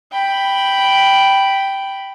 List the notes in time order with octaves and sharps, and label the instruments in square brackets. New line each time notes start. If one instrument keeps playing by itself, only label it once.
[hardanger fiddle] G5 B5